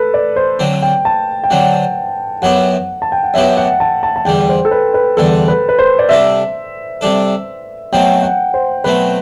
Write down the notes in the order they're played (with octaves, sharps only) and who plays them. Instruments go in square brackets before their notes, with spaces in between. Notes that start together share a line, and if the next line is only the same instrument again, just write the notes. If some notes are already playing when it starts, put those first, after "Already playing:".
Already playing: [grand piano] A4 B4
D5
C5
[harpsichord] D3 F#3 C4
[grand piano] G5
A5
G5
[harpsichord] D3 F#3 C4 [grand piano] F#5
[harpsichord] F#2 F#3 B3 E4 G4 [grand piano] F#5
[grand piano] A5
G5
F#5
[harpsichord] F#2 F#3 B3 E4 G4 [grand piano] E5
[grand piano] F#5
A5
A5
A5
[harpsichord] E2 D3 G3 [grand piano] G5
[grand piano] C5
A4
B4
B4
[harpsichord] E2 D3 G3 [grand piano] A4
[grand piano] B4
B4
C5
D5
[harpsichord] C3 G3 D4 A4 [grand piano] E5
[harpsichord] C3 G3 D4 A4
[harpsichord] B2 F#3 A3 C4 [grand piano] G5
[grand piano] F#5
C5
[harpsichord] B2 F#3 A3 C4 [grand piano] B4